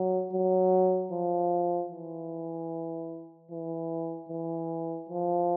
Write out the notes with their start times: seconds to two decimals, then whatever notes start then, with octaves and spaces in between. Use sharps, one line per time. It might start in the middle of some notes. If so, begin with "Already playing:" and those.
Already playing: F#3
0.33 F#3
1.12 F3
1.92 E3
3.51 E3
4.29 E3
5.09 F3